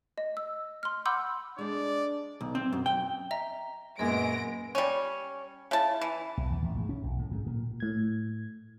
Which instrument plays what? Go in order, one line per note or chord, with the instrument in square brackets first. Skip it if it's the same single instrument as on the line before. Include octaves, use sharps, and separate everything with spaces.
[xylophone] D#5
E6
C6 F6
F#5 B5 C6 D6 E6 G6
[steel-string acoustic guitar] G#3 G#4 [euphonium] D4 [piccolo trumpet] D5
[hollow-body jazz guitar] B1
C4
F#2
G5
[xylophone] D#5 E5 A#5
[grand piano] F#2 A#2 [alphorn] G#3 [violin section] B3 A#6 D7 [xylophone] D#5 G#6
[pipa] G3 C#4
[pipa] C#3 A5 [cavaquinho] E4
[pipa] E3
[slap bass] B1
E2
A1
G#2
C#4
B1
A2
G#2
A#2
[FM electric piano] A2 G#6